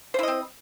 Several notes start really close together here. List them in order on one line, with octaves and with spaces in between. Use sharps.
C5 E4 D#5 C4